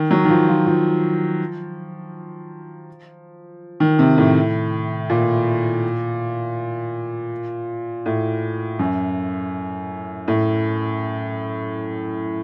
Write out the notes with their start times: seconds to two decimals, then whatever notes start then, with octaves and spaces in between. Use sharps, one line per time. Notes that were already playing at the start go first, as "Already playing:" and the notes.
Already playing: D#3
0.11 F#3
0.25 D#3
0.29 F3
0.48 F3
0.66 F3
3.80 D#3
3.99 C3
4.18 A2
5.10 A#2
8.06 A2
8.79 F#2
10.28 A2